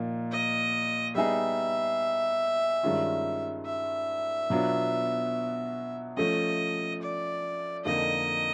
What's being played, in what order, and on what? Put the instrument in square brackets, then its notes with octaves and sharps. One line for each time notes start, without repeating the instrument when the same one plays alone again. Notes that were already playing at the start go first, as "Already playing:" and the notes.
Already playing: [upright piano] A#2 F3 A#3 D#4
[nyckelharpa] D#5
[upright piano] G3 B3 D#4 G#4 [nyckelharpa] E5
[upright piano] G2 D#3 G#3 C#4 F4
[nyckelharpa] E5
[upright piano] B2 F#3 B3 D4 F4
[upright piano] F3 A3 C#4 [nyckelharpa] D#5
[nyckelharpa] D5
[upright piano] F2 D3 F3 A#3 D#4 [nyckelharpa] D#5